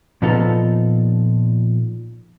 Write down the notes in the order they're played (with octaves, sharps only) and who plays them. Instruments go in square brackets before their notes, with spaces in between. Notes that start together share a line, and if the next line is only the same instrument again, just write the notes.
[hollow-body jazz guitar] A#2 F3 B3 D#4 F4 A4